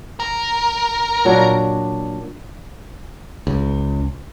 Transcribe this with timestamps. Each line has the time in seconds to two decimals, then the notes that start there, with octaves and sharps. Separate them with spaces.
0.20 A#4
1.25 A#2 F#3 D4
3.47 C#2